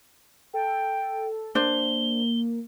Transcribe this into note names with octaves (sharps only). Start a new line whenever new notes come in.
A4 G5
A#3 D4 C5 G7